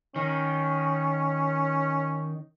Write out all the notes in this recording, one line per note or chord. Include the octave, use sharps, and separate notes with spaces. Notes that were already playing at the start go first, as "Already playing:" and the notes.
D#3 C#4